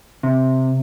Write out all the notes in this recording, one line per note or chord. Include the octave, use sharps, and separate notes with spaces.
C3